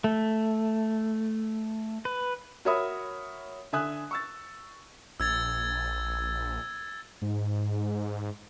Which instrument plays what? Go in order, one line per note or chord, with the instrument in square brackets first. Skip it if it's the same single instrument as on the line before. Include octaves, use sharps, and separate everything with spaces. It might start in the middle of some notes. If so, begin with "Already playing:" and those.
[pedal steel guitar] A3
B4
[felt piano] F#4 A#4 C#5 E5 B5 D#6
D3 E5 G#5 D#6 F#6
C#6 E6 A6
[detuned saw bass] A#1 [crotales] E6 G#6 A6
[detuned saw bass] G#2